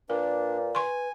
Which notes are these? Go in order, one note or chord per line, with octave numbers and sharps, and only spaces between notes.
A#2 D4 A#4 B4
B4 G#5 C6 C#6